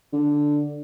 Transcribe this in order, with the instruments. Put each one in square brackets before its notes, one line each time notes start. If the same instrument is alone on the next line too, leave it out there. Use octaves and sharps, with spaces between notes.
[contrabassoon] D3